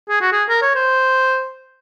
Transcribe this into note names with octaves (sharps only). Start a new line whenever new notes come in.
G#4
F#4
G#4
A#4
C#5
C5